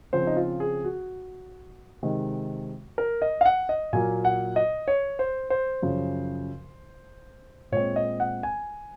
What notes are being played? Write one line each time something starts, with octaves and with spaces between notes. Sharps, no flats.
C#3 F3 C4 C5
D#4
F4
G#4
F#4
C3 D#3 G#3
A#4
D#5
F5
F#5
D#5
A#2 F#3 A#3 G#5
F#5
D#5
C#5
C5
C5
F#2 C#3 F3
A#2 G#3 C4 C#5
D#5
F#5
G#5